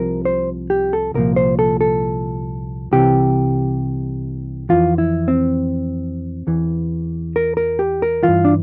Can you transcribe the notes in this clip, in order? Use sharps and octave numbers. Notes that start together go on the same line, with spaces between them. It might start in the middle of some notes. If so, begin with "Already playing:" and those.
Already playing: C2 C3 F3 A#4
C5
G4
A4
C2 A#2 F3 A#4
C5
A4
A4
C2 C3 E3 G4
F2 E3 F4
E4
C4
E2 E3
A#4
A#4
G4
A#4
G2 E3 F4
D4